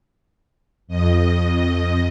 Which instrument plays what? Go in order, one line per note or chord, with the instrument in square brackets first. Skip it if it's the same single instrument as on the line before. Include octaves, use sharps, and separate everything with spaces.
[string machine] F2 D#5